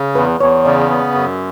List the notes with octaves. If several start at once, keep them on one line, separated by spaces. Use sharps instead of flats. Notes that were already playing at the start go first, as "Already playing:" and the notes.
Already playing: C#3
E2 B4
E2 C#5
C#3 D5
B3
F#2